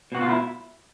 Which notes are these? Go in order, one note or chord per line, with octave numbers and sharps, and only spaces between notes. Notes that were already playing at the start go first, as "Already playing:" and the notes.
B2 F#4
F4
E4